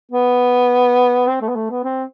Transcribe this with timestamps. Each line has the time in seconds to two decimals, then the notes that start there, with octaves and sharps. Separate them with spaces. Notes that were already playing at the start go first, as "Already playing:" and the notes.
0.12 B3
1.27 C4
1.41 A3
1.49 B3
1.56 A3
1.70 B3
1.84 C4